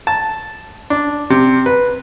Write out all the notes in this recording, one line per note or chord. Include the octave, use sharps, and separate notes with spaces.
A5
D4
C3
B4